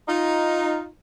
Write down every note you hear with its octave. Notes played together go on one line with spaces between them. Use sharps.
D#4 F4